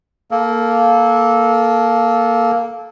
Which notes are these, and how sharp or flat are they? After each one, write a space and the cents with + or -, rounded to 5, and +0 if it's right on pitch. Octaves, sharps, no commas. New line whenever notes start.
A#3 +0 A4 -20